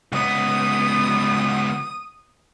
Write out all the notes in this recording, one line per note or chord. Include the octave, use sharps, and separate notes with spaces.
C#2 B3 D#6